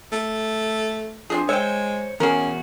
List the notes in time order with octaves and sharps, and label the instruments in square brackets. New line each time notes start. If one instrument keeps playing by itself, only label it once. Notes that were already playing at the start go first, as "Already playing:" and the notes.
[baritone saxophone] A3
[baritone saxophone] F3 [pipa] C4 D4 G#4
[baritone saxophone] G#3 [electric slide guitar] C5 C#5 [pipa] E5 G5
[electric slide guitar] E2 F#4 [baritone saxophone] C#4 [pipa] G#4 A#4